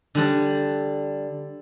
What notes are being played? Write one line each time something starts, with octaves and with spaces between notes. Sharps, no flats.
D3 G3 D4